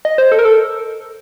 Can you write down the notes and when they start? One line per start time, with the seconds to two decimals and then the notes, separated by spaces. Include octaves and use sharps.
0.05 D#5
0.18 C5
0.32 A4
0.39 A#4
0.45 A4